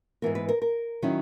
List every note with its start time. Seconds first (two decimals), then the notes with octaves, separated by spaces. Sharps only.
0.22 G#2 E3 B3 A#4
0.35 B4
0.49 A#4
0.62 A#4
1.02 D#3 F#3 C#4 E4